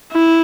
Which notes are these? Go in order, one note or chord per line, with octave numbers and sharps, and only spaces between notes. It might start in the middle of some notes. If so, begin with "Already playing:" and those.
E4